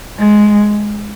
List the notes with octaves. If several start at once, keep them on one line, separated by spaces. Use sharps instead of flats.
G#3